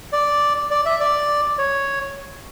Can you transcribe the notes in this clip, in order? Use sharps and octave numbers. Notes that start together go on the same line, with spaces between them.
D5
D5
E5
D5
C#5